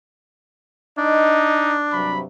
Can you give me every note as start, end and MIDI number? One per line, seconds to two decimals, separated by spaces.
0.98 2.24 62
0.98 1.77 63
0.98 1.64 75
1.92 2.23 43
1.92 2.23 48
1.92 2.23 54
1.92 2.19 83